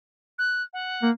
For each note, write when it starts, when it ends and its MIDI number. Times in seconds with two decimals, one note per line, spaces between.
0.39 0.62 90
0.73 1.08 78
1.03 1.11 58